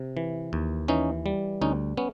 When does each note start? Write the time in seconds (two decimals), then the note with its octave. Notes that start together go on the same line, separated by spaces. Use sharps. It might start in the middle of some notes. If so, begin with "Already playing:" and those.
Already playing: C3
0.17 E3
0.53 D#2
0.88 E3 C#4 D#4
1.26 G3
1.61 D2 C#4 D#4
1.97 B3 C#4